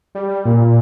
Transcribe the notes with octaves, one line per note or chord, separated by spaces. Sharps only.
G3
A#2